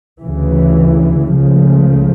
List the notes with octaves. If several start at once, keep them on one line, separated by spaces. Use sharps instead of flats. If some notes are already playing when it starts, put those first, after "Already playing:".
D2 C#3 E3
C#2 C#3 F3 A3